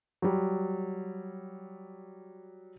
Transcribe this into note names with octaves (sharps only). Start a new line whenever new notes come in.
F#3 G3